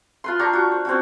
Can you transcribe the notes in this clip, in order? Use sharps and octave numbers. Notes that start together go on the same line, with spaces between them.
F4 B4 C6
D4 G4 A#5 C#6
F#4
C5
C4 C#4 F#4